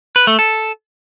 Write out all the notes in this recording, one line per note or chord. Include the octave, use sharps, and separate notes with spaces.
B4
A3
A4